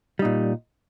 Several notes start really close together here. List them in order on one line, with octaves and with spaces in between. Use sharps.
G3 D#4 A#2